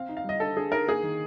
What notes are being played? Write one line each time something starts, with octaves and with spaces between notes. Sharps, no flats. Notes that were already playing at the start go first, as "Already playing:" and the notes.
Already playing: C4 F5
D#4
F5
G3 D#5
D3 A4
D3 G#4
D#4 A#4
A#3 G#4
D#3